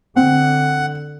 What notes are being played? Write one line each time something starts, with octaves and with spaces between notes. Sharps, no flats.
D3 C4 F#5